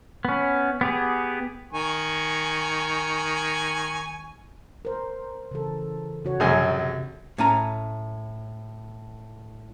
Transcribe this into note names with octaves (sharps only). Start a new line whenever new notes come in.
B3 C#4
B3 G4 G#4
D#3 G#5 C#6
A#4 C5
C#3 E3 A4
C#3 F#4 C#5
A#1 F#2 C3 G#5
A2 C#4 G#5 A#5